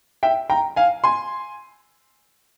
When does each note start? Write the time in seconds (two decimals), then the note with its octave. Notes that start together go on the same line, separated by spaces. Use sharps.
0.23 E5 G5
0.50 G5 A#5
0.76 F5 G#5
1.04 G#5 C6